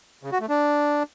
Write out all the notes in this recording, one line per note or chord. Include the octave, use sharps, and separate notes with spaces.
C#3
F#4
A3
D4